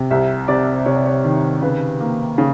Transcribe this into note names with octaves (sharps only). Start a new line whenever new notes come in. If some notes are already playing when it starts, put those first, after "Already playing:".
Already playing: C3
C2 E5
C3 D5
C3 C#5
D5
C#5
D#3
C#3 B4
A#3
C#3